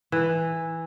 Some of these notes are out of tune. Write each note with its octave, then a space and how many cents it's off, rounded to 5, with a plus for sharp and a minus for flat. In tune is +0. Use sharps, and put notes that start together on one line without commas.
E3 -5